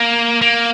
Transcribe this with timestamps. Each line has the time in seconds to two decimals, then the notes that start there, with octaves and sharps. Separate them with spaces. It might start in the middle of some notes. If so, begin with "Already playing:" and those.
Already playing: A#3
0.41 A#3